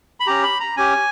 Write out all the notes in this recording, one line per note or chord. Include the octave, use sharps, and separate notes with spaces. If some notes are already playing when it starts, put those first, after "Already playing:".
B5
C#4 G4 A#5
B5
A#5
C#4 G4 G#5